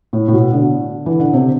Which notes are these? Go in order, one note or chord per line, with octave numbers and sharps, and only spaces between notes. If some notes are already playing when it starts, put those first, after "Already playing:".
A2
A2
B2
D3
E3
D3
C3